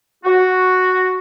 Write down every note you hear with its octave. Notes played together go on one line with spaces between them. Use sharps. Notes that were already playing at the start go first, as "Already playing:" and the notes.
F#4